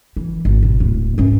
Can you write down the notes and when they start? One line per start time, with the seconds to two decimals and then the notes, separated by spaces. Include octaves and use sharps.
0.16 E3
0.45 G#1
0.63 B2
0.80 D1
1.18 G#2 C#4